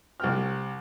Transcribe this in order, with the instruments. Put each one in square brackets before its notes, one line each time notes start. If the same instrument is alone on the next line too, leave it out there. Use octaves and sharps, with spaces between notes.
[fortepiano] C2 G5 F6